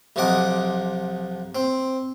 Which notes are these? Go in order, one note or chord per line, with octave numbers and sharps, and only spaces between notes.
B1 C3 F3 D#5 F#5 D6
C4